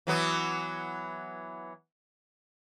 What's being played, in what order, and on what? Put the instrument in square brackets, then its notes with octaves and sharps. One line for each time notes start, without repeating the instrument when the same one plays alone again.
[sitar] E3 F#3 B3